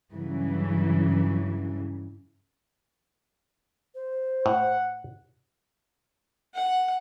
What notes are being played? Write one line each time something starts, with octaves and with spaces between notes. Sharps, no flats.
G2 C#3 E3 F#3
C5
A2 F#5
F#5